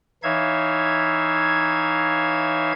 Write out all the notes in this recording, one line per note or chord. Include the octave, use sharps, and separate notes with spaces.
E3 D#4 C#5 E5 F5 G#6